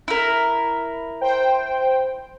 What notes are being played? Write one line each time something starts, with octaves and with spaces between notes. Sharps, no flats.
E4 A#4
C5 G5